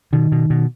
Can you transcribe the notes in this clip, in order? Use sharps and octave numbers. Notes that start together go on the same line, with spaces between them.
B2 D#3
B2
B2